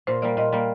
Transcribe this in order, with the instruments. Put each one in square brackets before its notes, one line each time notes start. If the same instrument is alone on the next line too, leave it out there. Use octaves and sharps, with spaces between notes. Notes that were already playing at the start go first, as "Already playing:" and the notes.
[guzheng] A#2 [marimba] C5
[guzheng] G3 A#3 [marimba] D5
[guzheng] A#2 [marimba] D#5
[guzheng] G3 A#3